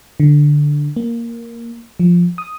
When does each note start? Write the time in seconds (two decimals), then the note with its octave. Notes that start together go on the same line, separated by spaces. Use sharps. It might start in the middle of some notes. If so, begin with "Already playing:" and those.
0.20 D3
0.96 A#3
2.00 F3
2.38 D#6